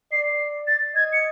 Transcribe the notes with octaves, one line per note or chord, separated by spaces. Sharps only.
D5 C7
A6
D#5 G#6
C#7